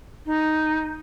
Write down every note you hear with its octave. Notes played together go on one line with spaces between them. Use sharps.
D#4